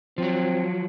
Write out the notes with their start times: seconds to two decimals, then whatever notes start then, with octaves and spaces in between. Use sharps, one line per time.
0.18 F3 F#3 C4